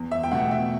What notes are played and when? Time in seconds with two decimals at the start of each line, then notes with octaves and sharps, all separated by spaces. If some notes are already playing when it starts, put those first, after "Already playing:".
Already playing: E2
0.11 E5
0.24 G5
0.31 B2 A3 F#5
0.51 E5